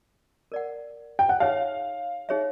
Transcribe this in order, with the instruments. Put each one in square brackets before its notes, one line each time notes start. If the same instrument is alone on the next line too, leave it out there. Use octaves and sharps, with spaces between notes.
[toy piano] A#4 D5 F#5
[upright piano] G5
F#5
[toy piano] D#4 G#4 C#5 E5 [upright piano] F5
[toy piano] D#4 G#4 C#5 E5